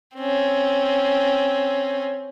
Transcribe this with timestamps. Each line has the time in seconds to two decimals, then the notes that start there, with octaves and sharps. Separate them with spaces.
0.17 C4 C#4